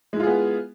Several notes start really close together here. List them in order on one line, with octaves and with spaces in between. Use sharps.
G#3 E4 F4 G#4 B3